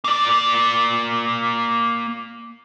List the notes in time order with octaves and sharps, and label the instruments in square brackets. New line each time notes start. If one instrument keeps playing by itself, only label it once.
[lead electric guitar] A#3 D5